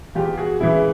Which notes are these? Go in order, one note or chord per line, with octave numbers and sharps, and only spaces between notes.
E2 F4 G4
F#4 G#4
C#3 E3 G#3 E4